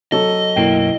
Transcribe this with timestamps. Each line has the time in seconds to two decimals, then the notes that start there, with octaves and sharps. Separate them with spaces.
0.12 F#3 A4 D#5
0.56 B1 F#2 A#3 E4 G5